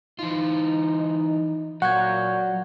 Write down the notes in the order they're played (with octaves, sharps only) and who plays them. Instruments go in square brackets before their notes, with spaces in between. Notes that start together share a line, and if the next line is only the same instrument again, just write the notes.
[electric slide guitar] E3 F4 [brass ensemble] D#4
[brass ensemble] A#2 [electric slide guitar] F#3 [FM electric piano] F#5 [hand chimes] C#6 G6 G#6